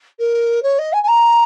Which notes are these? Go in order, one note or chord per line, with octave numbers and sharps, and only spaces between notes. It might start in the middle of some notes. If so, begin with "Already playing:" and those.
A#4
C#5
D#5
G#5
G#5
A#5